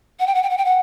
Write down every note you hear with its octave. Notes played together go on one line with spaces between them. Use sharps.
F#5
G5
F#5
G5
F#5
G5
F#5